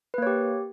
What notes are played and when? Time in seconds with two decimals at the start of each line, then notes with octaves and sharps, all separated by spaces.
0.14 B4
0.18 A#3
0.22 C#5
0.27 G4